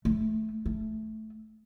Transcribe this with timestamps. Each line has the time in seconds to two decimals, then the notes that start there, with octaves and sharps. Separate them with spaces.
0.05 A3
0.66 A3